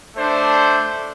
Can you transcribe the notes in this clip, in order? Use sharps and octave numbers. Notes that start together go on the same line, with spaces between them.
A3 D4 C5